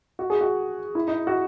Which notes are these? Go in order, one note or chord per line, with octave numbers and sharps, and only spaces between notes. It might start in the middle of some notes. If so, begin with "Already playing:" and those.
F#4
G#4
F#4
E4
D#4
F#4